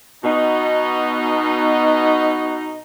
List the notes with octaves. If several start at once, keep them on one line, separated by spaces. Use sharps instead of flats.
B2 D#4